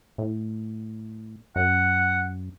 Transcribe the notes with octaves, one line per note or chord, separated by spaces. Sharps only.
A2
F#2 F#5